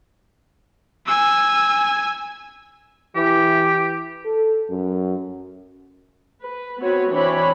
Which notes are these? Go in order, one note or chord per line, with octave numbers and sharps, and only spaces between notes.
G#5 E6
E3 G4
A4
F#2
B4
B3 C4 F#4 B4 C#5
E3 C4 D4 C#5 B5